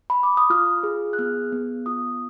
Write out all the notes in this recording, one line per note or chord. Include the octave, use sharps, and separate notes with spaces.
B5
D6
D#6
F4 F6
G#4
F#6
B3 F6
B3
F4 D#6